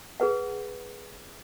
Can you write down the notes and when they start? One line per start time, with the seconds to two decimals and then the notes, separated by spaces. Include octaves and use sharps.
0.20 G#4 B4 F#5